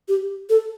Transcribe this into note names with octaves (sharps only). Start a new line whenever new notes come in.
G4
A4